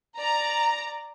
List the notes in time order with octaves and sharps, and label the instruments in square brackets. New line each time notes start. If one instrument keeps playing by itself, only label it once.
[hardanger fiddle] D5 [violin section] A#5